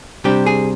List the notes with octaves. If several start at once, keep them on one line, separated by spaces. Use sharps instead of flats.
C3 G3 D4 G4
G#4